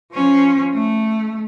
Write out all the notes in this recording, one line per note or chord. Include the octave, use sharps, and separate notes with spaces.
F3 C#4
A3